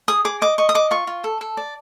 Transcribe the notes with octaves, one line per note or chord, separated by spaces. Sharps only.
G#4 D#6
G#4 D6
D#5 D6
D#5 C#6
D#6
D#5 D6
F4 C#6
F4
A4
A4
D5